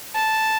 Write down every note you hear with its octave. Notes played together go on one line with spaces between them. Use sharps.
A5